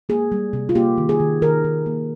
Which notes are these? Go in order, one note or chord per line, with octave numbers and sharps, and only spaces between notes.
A#3 G#4
G3
C3
F4
A#3 G4
D#3
G#4
D#3
D#3 A#4
D#3
A#3